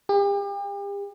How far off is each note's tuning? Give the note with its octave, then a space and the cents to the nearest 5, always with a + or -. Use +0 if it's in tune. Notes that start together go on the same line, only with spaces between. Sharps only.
G4 +40